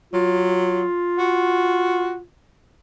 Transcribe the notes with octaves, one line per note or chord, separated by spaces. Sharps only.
F#3 F4
F#4